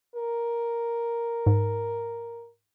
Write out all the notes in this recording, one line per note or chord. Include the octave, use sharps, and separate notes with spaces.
A#4
G#2